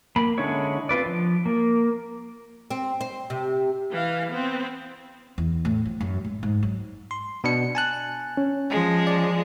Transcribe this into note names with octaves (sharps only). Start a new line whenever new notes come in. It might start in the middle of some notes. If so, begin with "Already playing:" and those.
A#3 B5
D3 G#3 C#4 E4 C#5
C4 F4 B4 D5
F3
A#3
C4
C5
C3
E3 F5
B3 C4
E2
A2
F3
F#2
G#2
G#2
F#3
C6
B2 D4 C#7
G#5 A5 F#6
C#4
F3 G#3
D5